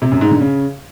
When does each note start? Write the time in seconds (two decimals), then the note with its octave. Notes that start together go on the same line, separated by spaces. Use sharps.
0.02 C3
0.11 F#2
0.21 G#2
0.31 D3
0.41 C#3